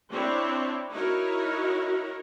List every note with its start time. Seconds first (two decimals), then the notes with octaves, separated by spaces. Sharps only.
0.11 C4 D4 E4 C#5
0.91 D#4 E4 F#4 A#4 C#5